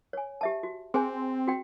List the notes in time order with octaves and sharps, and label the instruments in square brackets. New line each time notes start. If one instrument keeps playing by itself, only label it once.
[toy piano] C#5 G#5
G4 E5 A5
F#4
[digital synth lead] C4 [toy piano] G#4 C5 G#5
[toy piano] F#4 G5